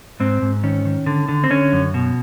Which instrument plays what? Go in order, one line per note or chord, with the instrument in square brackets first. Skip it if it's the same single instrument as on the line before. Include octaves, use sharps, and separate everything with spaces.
[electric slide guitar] G#2 C4
G#2
D#3 C#4
D#3
D3
D3
C4
D3 C#4
F#2
B2